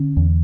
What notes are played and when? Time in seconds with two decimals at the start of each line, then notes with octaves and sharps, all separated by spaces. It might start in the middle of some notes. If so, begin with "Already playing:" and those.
Already playing: D3 C#4
0.17 E2